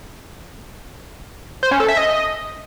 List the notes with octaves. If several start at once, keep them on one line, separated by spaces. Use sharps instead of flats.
C5
C#4
A4
E5
D#5